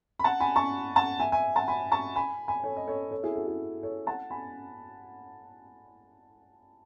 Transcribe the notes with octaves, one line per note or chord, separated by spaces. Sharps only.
B5
F#5 A5
G#5 B5
A5 C#6
F#5 A5
E5 G#5
E5 G#5
F#5 A5
G#5 B5
A5 C#6
G#5 B5
G#5 B5
A4 C#5
D#5
A4 C#5
A4 C#5
E4 G#4
F#4 A4
E4 G#4
A4 C#5
F#5 A5
G#5 B5